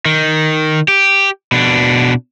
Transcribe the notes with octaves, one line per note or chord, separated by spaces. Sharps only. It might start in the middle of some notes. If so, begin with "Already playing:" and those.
D#3
G4
B2 D4